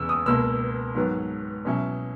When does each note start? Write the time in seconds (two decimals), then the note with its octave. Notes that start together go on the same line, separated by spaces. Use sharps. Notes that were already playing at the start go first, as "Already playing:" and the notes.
Already playing: E2 C#3 E6
0.09 D#6
0.26 C#2 B2 A#3 E6
0.95 G#2 D#3 F#3 B3
1.65 B2 F#3 C#4 E4